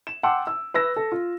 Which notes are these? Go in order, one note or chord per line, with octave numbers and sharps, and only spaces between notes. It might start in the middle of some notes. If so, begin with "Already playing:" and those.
E7
F#5 G5 A5 C6 D6 E6
E6
B4 E6 A#6
A4
F4